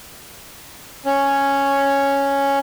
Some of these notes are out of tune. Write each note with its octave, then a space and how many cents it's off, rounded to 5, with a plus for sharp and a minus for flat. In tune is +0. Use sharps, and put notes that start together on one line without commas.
C#4 +0 C#5 +0